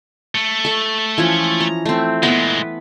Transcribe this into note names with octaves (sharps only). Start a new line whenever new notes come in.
A3
A4 C#6
E3 F3 C#4
A#5
A3 C4
A#2 G#3 B3 B4